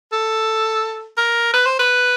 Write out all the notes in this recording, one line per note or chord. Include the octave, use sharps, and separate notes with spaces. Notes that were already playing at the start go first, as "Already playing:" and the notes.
A4
A#4
B4
C5
B4